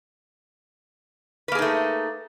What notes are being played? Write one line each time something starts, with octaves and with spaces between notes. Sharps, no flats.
A3 A#3 D#4 G#4 B4